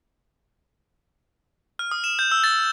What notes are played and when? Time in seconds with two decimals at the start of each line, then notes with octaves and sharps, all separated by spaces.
1.79 F6
1.91 D#6
2.04 E7
2.19 G6
2.32 E6
2.44 A6